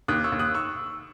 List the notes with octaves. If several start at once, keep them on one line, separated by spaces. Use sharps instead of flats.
D#2 D#6 F#6
C#6 E6
D#2
D#6 F#6
C#6 E6